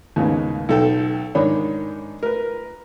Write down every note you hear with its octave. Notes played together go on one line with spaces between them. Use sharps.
D#2 G#2 C#3 B3
B1 A4 G5
G#2 D#3 D4 C#5 B5
A#4 B4